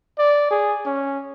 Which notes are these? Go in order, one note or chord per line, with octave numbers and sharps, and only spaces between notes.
D5
G#4
C#4